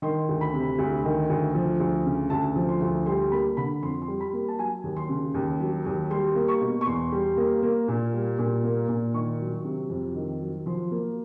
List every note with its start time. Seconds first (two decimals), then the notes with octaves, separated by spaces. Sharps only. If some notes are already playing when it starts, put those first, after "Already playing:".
0.02 D#3 C6
0.29 D2
0.41 B5
0.53 C3
0.78 D2
1.04 D#3
1.29 D2
1.55 F3
1.80 D2
2.05 C#3
2.30 D2 A5
2.56 F3
2.68 C6
2.81 D2
3.06 G3 C6
3.31 A#3 B5
3.57 D3 B5
3.82 F2 C6
4.02 C6
4.08 G3
4.20 B5
4.33 A#3
4.48 A5
4.58 F#3 G#5
4.84 D#2
4.96 C6
5.09 C#3
5.34 D#2
5.60 F#3
5.86 D#2
6.10 G3 C6
6.35 A#3
6.48 C#6
6.61 B2
6.81 C#6
6.86 E2 C6
7.12 G3
7.37 A#3
7.62 A#3
7.88 A#2
8.13 G3
8.39 A#2
8.64 A#3
8.88 A#2
9.14 D#3 C#6
9.40 F#3
9.64 C3
9.89 F2
10.15 D#3
10.41 F#3
10.66 F3 C6
10.91 A#3